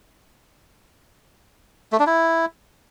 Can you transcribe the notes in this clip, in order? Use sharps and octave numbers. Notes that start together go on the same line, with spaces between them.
A3
D4
E4